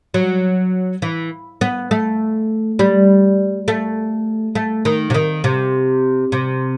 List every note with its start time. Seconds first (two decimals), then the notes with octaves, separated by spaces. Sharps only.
0.14 F#3
1.02 E3
1.61 B3
1.91 A3
2.79 G3
3.68 A3
4.55 A3
4.85 D#3
5.10 C3
5.14 D#3
5.44 C3
6.32 C3